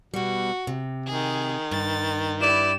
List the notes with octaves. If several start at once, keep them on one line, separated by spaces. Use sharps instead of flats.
B2 G3 F#4
C3
D#3 G#4
G2 A6
E4 G4 B4 D5 E7